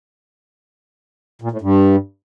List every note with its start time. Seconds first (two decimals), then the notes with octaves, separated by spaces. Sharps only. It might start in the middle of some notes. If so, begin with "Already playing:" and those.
1.42 A#2
1.51 A2
1.61 G2